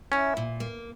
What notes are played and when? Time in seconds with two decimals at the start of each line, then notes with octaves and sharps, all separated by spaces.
0.12 C#4 E4
0.37 A#2
0.60 A#3